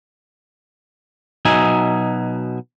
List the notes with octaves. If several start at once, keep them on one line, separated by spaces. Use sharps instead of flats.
B2 F#3 D#4 D#5 E5 G#5